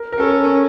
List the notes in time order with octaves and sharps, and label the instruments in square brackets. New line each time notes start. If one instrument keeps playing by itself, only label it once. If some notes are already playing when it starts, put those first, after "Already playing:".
Already playing: [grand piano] A#4
A#4
[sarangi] C#4 [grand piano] A4